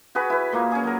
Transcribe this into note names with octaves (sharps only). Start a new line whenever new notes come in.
F#4 G#4 B4 B5
E4 B4
A#2 A#3
C#4 G#4
F#3 A#4